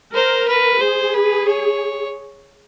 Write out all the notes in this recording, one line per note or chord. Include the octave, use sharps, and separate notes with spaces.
A#4 C5
B4
G#4 C5
B4
C#5